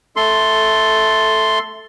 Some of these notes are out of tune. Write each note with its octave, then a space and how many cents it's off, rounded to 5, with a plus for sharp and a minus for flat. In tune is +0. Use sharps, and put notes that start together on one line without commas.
A3 -10 A4 +0 C6 +0